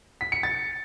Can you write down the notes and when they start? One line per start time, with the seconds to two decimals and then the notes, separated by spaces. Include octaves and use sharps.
0.21 B6
0.32 C#7
0.43 A6